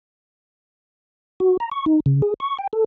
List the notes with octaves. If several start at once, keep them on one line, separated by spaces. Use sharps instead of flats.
F#4
A#5
C#6
D#4
C#3
G#4
C#6
G5
A4